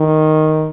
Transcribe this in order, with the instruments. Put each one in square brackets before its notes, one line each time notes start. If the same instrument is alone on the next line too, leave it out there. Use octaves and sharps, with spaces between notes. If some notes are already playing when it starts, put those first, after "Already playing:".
Already playing: [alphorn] D#3